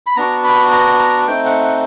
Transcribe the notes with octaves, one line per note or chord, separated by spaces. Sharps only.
B5
B3 D4 F#4 A#5
B5
A#5
A#5
A3 C4 D#4 G5
F#5
F#5